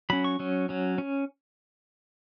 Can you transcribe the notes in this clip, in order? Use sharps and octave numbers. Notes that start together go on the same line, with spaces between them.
F#3 C#4 B5
C#6
F#3 C#4
F#3 C#4
C#4